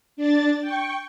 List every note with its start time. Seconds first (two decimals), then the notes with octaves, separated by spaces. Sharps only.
0.17 D4 A6
0.62 G5 C#6